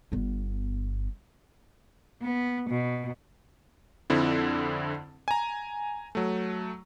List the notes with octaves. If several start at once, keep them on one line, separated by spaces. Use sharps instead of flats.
G1 B3
B3
B2
F2 D3 C4 E4
G#5 A#5
F#3 A3